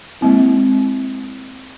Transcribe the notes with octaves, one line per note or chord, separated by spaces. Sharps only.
G#3 A#3 C4 E4